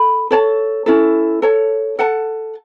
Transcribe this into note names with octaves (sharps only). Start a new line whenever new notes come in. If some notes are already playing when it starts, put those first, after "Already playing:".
Already playing: A4 B5
A4 C#5 A5
C#4 E4 A4
A4 C#5 A5
A4 F#5 A5